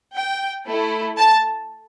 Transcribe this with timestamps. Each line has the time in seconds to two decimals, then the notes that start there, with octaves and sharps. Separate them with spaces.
0.15 G5
0.66 A3 E4 A4
1.17 A5